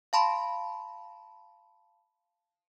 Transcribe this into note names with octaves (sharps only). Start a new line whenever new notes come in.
F5 A5 B5 C6